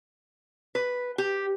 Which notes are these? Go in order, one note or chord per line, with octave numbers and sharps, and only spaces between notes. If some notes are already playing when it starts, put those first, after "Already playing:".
B4
G4